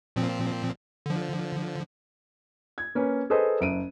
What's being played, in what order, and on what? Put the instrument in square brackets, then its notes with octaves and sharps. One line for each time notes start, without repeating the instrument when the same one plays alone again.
[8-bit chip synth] A#2 F3 C4
D3 F3
[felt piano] G#6
A#3 C#4 B4
G#4 A4 B4 C5 D#5
F#1 D7 D#7